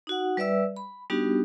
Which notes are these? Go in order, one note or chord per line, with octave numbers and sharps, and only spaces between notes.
D#4 F#4 F#5
G3 B4 D5 E5 E6
B5
G3 B3 D4 D#4 F#4 G4